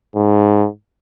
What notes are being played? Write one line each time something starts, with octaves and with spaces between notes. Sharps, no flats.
G#2